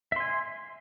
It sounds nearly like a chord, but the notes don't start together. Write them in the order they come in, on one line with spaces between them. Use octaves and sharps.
E5 C6 G#5